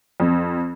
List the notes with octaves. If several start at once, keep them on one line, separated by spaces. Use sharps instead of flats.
F2